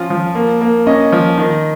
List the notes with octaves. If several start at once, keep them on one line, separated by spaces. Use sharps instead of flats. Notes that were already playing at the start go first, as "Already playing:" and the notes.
Already playing: F3 C#4 F4
F3
A#3
A#3
C#4 D#5
F3
D#3